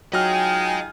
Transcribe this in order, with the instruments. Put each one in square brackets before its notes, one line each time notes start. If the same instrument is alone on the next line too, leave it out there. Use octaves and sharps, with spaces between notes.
[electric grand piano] F#3 F6 [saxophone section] D#4 F4 G#4 [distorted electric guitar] D#5 G#5 [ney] G5